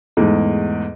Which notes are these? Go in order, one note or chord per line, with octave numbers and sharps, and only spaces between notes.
E2 G#2 A3